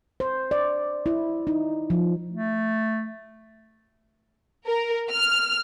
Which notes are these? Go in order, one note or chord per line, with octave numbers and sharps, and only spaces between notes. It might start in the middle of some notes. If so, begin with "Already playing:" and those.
C5
D5
E4
D#4
F3
A3
A#4
F6